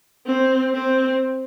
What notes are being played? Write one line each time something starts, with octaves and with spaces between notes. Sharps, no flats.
C4
C4